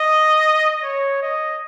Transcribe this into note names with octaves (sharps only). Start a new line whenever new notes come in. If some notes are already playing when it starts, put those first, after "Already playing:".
Already playing: D#5
C#5
D#5